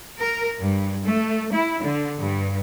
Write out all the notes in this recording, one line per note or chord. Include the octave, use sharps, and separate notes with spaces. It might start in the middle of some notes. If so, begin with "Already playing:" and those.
A#4
G2
A3
E4
D3
G2